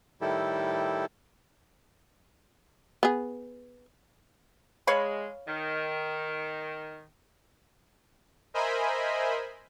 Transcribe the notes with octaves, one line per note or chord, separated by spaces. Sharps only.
A2 D#3 G3 E4 G4 A4
B3 G#4
G#3 C#5 F5 B5
D#3
A#4 C5 D#5 E5 G#5 B5